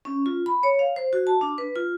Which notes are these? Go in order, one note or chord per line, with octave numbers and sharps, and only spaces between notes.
C#4
F4
B5
C#5
F5
C5
F#4
A5
D4
B4
F4